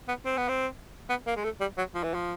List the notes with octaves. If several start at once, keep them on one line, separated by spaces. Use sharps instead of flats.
B3
C4
B3
C4
B3
A#3
G#3
A3
G3
F#3
F3
E3
F3